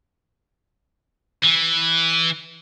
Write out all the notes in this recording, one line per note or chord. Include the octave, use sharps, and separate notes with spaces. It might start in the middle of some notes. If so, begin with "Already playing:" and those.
E3